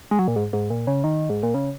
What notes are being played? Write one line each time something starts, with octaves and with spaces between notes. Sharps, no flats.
G#3
F#3
A#2
G#2
G#2
A#2
C#3
D#3
G#2
A#2
C#3